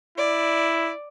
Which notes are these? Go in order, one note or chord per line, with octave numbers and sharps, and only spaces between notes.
E4 D5